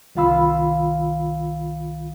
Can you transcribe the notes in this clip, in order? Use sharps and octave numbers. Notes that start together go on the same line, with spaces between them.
C2 D#3 F4 F5 B5 E6